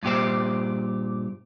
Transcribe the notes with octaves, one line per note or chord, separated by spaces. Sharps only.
G2 A#2 G4 C5